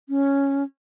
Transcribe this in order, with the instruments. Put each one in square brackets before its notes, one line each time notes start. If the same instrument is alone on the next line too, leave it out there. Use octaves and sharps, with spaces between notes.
[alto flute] C#4